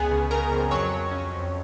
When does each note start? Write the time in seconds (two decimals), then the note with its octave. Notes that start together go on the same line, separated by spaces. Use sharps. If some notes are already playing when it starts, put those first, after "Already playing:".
Already playing: C#2 B3 G#4 G#5
0.11 C#3
0.31 C#3 A#4 A#5
0.52 F2
0.71 F#3 C#5 C#6
0.91 F#3
1.11 C#4
1.32 F2